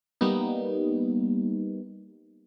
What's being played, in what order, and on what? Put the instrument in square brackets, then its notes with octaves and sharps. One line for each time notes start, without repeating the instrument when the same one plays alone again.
[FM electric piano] G3 A#3 B3 D#4